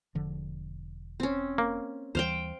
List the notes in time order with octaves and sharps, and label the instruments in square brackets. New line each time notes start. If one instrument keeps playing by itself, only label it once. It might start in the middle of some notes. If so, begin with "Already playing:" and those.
[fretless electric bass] E1 D3 F3
[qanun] C4 C#4
[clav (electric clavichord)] A#3
[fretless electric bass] D#2 E3 G3 [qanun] C5 F5 G5